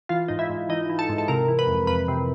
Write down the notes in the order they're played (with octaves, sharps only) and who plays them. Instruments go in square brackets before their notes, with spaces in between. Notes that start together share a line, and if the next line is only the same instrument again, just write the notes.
[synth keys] E3 F4
G#2 D#4
E4
G#2
E3 D#4
E3
A4
G#2
A4
C3 A#4
E3
B4
F2
F2 B4
C3